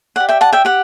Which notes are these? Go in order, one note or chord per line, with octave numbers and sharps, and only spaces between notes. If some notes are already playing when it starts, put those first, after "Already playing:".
G4 D5 F#5
E5 G5
F#5 A5
E5 G5
G4 F#5